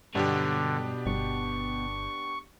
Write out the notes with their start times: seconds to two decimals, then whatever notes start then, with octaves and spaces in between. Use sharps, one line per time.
0.15 G2 B2 D3 B3 D4 G4 C#5
1.06 G1 C#6